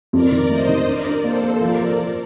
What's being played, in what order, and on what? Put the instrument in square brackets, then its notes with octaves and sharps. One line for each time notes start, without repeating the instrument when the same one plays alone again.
[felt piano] F2 [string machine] A#4 D5
[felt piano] D#3
[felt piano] A3 [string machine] C5 D#5
[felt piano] D#3
[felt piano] D4 [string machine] A#4 D5
[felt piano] D4
[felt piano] A#3 [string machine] A4 C5
[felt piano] A#3
[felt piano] F3 [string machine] A#4 D5
[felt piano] F3
F3